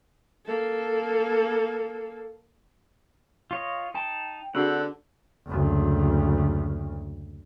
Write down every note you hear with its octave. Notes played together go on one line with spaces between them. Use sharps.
A#3 A4
F4 C#5 D#5
D#4 G5 A5
D3 C4 D4 F#4 G#4 F#5
F#1 D2